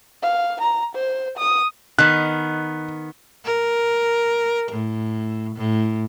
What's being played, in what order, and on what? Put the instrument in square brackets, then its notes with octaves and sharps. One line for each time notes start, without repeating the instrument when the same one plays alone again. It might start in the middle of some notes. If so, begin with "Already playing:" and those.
[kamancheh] F5
A#5
C5
D#6
[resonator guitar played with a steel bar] D#3 B3 [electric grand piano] F#6
[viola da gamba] A#4
A2
A2